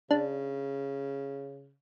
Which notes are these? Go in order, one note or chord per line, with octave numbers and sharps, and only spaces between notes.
C#3 D4